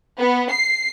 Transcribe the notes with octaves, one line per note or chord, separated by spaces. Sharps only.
B3
C7